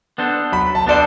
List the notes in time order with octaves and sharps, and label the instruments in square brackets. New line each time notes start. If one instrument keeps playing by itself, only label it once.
[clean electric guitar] B3 D4 A4 C5
[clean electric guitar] F#3 [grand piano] B5
[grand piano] A5
[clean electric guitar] B3 D4 A4 C5 [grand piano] D5